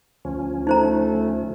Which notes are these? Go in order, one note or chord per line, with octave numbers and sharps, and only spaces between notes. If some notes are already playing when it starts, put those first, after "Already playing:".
D2 F3 C#4
A3 D#4 C5 A#5